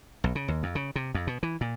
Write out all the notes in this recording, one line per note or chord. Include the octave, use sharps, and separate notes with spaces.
B1
C#3
D#2
F2
C#3
C3
F2
B2
E3
A#2